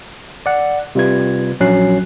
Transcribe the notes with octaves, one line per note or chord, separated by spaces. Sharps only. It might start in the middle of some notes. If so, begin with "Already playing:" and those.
D5 F#5
C3 G3 F4 B4 G#6
A#1 F#3 C#4 F#4 F#6 C7